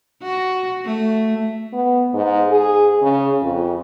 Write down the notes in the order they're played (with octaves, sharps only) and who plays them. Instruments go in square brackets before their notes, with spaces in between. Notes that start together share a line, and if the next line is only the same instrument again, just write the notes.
[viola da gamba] F#4
A3
[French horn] B3
G#2
G#4
C#3
F2